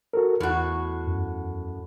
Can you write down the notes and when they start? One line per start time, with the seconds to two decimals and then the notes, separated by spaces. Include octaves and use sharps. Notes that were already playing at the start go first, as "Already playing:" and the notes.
0.13 F#4 A4 A#4
0.40 E2 A2 F#4
1.07 F#2